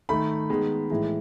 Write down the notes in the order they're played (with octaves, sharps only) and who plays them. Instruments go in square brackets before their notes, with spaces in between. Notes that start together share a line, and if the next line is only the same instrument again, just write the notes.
[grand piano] D#3 A3 B5
D#3 G#3 B3
A2 E3 G#3